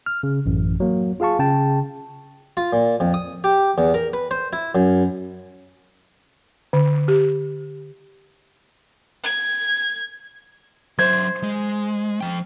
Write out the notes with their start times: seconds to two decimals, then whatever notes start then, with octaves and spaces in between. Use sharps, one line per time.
0.06 F6
0.23 C#3
0.46 A1 F#2
0.80 F#3 A#3
1.20 F4 G#4 F5 A5 C#6
1.39 C#3 G5 A5
2.57 F4
2.73 A#2
3.00 F2
3.14 D#6
3.44 G4
3.78 E2
3.94 A#4
4.13 B4
4.31 C5
4.53 E4
4.75 F#2
6.73 D3
7.08 G4
9.24 G#6
10.98 F#3 C5 E5 G#6
11.43 G#3
12.21 F3 G5